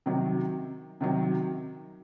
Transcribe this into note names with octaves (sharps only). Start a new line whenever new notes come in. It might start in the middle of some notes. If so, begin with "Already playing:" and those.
C3 D#3 F#3
C3 D#3 F#3